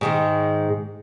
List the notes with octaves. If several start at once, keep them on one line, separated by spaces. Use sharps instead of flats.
G#2 D#3 G#3